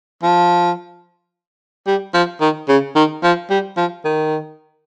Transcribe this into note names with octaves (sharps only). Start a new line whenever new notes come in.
F3
G3
F3
D#3
C#3
D#3
F3
G3
F3
D#3